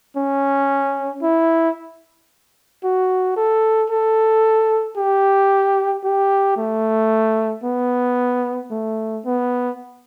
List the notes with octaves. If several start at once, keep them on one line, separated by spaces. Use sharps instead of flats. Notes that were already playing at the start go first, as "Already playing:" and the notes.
C#4
E4
F#4
A4
A4
G4
G4
A3
B3
A3
B3